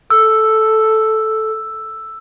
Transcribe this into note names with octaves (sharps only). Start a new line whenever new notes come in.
A4 E6